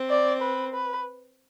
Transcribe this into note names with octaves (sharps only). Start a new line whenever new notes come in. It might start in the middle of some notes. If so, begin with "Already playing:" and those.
Already playing: C4
D5
B4
B4